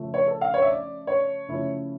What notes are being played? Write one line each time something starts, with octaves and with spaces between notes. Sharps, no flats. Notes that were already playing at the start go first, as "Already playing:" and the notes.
Already playing: C#3 F3 A3
C#5
A4
F5
C#5
E5
D5
C#5
C#3 F3 A3 C#4 E4